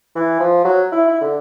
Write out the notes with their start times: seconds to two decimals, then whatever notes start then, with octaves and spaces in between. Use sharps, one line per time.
0.15 E3
0.40 F3
0.64 F#3
0.92 E4
1.08 E4
1.21 D3